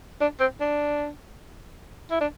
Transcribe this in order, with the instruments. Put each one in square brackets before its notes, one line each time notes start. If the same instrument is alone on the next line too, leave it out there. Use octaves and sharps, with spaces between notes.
[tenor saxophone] D4
C4
D4
E4
D4